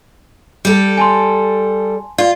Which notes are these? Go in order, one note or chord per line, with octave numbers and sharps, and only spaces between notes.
G3 A4
G#5 A5 C6
F4 D5